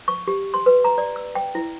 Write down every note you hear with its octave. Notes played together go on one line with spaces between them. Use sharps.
C#6
G4
C6
B4
A#5
D5
E6
G5
E4